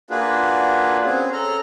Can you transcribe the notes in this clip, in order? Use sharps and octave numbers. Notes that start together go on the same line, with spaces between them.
A#3 D4 F4 F#4 G#4 B4
C4 C#4 G#4
A4 A#5 F6